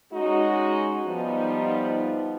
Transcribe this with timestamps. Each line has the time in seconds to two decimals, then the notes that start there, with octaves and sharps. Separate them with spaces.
0.13 G#3 C#4 D#4 F#4
1.05 F3 G3 B3 D#4